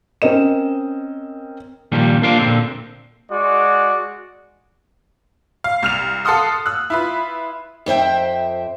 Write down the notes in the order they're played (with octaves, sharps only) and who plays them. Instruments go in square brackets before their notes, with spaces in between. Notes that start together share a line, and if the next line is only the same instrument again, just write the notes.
[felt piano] C4 C#4 A#4 D#5 E7
[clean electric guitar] A#2 D#3 F3 G3
A#3 D4 F4 C5 D5
A#2 D3 C4
[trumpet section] G#3 F#4 D5
[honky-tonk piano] F5
C2 F6 F7
A4 F5 F#5 C6 D#6 F6
E6 F#6
E4 F4 B4
[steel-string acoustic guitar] F2 C5 E5 G5